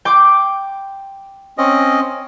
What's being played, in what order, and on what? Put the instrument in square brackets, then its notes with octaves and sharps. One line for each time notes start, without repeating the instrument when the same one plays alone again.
[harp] G5 C6 D6
[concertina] C4 C#4 D#5